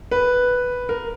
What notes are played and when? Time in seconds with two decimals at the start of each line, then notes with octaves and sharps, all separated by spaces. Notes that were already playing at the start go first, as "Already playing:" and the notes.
0.11 B4
0.89 A#4